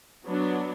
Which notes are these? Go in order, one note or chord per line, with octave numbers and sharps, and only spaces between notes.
F#3 B3 D4